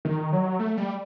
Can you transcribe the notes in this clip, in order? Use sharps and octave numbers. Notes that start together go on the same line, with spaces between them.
D#3
F#3
A3
G3